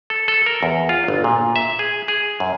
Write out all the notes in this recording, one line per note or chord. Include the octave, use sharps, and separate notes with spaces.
A4
A4
A#4
E2
F4
G1
A#2
E5
G#4
G#4
F#2